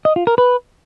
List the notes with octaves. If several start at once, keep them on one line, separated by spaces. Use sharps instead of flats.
D#5
F4
A#4
B4